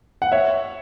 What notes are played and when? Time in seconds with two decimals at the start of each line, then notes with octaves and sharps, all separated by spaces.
0.22 F#5
0.32 C#5 E5